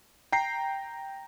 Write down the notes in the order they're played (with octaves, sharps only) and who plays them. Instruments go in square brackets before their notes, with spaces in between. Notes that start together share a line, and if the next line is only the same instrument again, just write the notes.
[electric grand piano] G5 A#5 C7